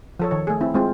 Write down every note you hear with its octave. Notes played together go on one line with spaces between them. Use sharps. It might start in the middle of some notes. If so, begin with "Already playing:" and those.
F3 A4 C#5
D#3 C#5
A3 G#4
C4 E4
G#3 C4 F4